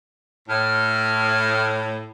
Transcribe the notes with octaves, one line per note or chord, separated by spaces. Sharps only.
A2 F6